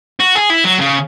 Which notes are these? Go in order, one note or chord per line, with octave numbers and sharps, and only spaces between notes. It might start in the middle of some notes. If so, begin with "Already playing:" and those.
F#4
G#4
E4
F#3
C#3